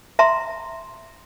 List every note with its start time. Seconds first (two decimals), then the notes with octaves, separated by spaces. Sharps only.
0.19 E5 A#5 C6